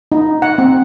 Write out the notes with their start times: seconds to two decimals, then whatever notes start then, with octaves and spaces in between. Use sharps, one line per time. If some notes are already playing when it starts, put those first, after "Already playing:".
0.12 D#4
0.42 F#5
0.58 C4